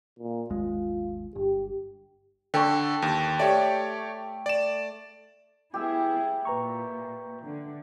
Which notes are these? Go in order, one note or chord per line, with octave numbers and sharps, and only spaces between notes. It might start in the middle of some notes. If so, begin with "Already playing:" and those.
A#2
G#1 D#2 G#3 F4
G1 G4
D3 A4 G5 A5 C#6
D#2
A3 G4 C#5 D5
D5 E7
B3 E4 G4 G#4 E5
A#2 B4 A#5 C#6
D3